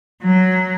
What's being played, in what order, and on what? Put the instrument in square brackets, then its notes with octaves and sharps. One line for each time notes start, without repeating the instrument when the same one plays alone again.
[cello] F#3